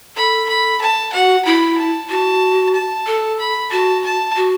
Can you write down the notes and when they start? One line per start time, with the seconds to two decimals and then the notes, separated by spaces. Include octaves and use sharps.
0.16 A4 B5
0.49 B5
0.81 A5
1.13 F#4 F#5
1.45 E4 B5
1.78 A5
2.10 F#4 A5
2.74 A5
3.07 A4
3.39 B5
3.71 F#4 A5
4.04 A5
4.36 F#4